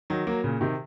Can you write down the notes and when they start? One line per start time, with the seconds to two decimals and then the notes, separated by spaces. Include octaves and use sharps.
0.10 D#3 F#3
0.27 F#3 A#3
0.44 A#2 C#3
0.61 C3 D#3